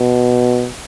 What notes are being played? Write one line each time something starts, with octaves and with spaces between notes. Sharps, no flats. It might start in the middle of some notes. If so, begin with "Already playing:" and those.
Already playing: B2